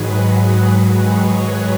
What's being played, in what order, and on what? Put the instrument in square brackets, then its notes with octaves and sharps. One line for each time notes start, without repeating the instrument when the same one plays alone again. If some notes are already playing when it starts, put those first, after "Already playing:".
Already playing: [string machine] G#2 D#3 F#3 G#4 B4
F#4
G#4
B4
C#5